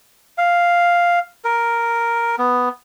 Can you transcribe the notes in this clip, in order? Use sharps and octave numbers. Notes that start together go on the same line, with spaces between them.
F5
A#4
B3